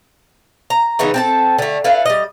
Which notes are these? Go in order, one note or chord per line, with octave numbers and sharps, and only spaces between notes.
A#5
C#3 E3 B3 D#4
C4 A4 A5
D3 A3
E4 A4 B4 F5
G3 D#5